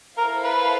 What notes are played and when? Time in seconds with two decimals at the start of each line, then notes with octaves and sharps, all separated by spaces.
0.17 E4 A4 A#4 C5 F5
0.44 B4